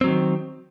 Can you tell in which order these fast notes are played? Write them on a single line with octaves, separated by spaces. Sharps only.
C4 F#3 D#3